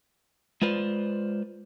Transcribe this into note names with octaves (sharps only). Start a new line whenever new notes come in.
G#3 F4 B4 C5 D5